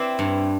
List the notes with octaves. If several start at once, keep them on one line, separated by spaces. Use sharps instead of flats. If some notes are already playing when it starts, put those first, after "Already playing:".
Already playing: C4 E4 B4 D5
G2